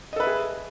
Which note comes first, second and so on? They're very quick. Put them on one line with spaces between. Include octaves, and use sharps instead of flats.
D#5 A4 B4 E5 G#4